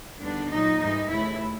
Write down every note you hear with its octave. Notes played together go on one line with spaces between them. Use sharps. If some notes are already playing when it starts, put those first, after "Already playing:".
D#2 D3 G3 B3 D4
A#2 F#3 A#3 D#4
G#2 E3 G3 A#3 D#4
D#2 C#3 E3 A3 E4